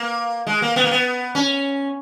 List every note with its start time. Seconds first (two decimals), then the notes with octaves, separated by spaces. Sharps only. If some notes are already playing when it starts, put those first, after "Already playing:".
Already playing: A#3
0.47 G#3
0.62 A#3
0.76 B3
0.84 A#3
0.91 B3
1.35 C#4